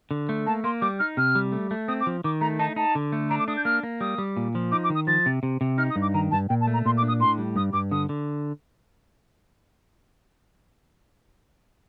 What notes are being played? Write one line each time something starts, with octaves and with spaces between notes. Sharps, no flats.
D3
A3
A#3 A5
A#3 C6
G3 D6
D#4 F6
C3 F6
G3
A3
A3
C4 D#6
D6
F3
D#3 D6
A3 A#5
D#4 A5
D#4 A5
D3
A3
D4 A#5
D6
D4 D#6
G6
A#3 F6
A#3
G3 D#6
G3
A#2
F3
D#4 D6
D6
D#3
D#6
F3 A6
C3
C3
C3
D#4 F6
D#6
G2
D6
D#3 A#5
G2 A5
A#2 G5
A5
A3
A#5
A#2 C6
D6
D4
D#6
A2 C6
G3
G2 D#6
G2 D6
D3 D#6
D3